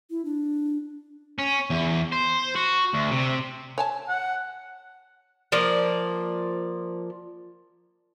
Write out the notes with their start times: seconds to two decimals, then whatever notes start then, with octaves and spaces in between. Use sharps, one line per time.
0.10 E4
0.25 D4
1.38 C#4
1.70 E2
2.12 C5
2.56 F#4
2.93 D2
3.11 C3
3.78 C#5 G#5 A5
4.09 F#5
5.52 F3 A#3 D5